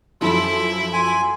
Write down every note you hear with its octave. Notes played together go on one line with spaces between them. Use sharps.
F#2 F3 E4 A4 C6
G#5 C6